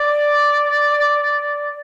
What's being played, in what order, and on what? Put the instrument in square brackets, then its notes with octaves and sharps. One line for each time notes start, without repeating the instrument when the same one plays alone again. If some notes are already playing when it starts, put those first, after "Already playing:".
Already playing: [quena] D5